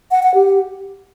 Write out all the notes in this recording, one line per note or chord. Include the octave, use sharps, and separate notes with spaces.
F#5
F#5
G4